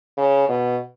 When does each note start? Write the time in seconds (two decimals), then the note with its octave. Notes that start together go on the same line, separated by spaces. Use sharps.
0.17 C#3
0.49 B2